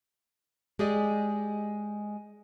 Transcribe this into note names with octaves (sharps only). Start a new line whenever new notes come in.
G#3 G4 G#4 D5 D#5